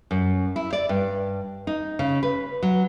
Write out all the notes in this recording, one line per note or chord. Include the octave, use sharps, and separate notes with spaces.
F#2
E4
D5
G2
D#4
C#3
B4
F#3